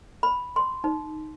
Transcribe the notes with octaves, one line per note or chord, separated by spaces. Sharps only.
B5
C6
D#4